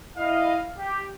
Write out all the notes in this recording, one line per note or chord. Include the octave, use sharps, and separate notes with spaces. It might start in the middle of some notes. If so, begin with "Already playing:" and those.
E4 D#5 F5
G4